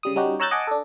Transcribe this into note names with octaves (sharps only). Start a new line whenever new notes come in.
C#3 G3 D#6
G3 C#4 D#4 F#4 G4
C#5 A#5 E6 F#6 G6 A6
D#5 F#5 G#5 A5 D6
D4 A4